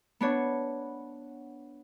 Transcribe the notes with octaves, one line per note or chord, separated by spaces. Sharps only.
B3 D4 C#5